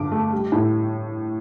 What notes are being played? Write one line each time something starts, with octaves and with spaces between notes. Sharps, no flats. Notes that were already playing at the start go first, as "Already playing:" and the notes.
Already playing: G2 D3 D6
A3
G3
A2